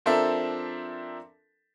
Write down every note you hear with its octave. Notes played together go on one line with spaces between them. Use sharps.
F3 C4 D4 A4 A#4 E5